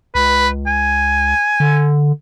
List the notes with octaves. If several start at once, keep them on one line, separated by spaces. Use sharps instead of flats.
C#2 B4
G#5
D3